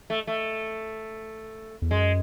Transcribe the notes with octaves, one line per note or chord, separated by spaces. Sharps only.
A3
A3
E2
F#2 G#3